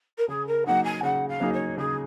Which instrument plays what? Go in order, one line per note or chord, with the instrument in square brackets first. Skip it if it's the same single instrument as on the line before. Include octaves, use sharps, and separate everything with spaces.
[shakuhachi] A#4
[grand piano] C#3 [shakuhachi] G#4
[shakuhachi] A#4
[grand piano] F#3 A#3 D#4 G#4 [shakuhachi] F#5
[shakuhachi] G#5
[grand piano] C#3 [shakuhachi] F#5
[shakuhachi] F5
[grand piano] F#3 A#3 D#4 G#4
[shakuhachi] C#5
[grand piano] C#3 [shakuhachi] G#4